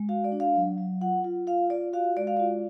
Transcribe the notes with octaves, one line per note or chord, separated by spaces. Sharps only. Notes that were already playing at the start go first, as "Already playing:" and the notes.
Already playing: G#3
F#4 F5
D5
D4
F5
F#3
F#3
F4 F#5
F4
F4 F5
F4 D5
F#4 F5
G#3 D5
F5
F4 D5